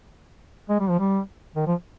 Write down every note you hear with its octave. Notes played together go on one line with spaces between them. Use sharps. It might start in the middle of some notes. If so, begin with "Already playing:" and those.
G#3
G3
F3
G3
D#3
F3